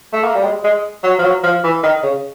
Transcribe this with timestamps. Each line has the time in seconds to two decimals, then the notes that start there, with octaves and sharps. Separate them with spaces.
0.13 A3
0.24 A#3
0.35 G3
0.44 G#3
0.64 G#3
1.03 F#3
1.19 F3
1.24 F#3
1.44 F3
1.64 E3
1.83 D#3
2.03 C#3